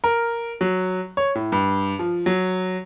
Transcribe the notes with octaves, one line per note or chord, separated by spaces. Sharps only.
A#4
F#3
C#5
A2
G2
F3
F#3